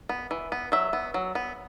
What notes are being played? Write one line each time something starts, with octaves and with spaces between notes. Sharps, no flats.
B3
E3
B3
F#3 E5
B3
F#3
B3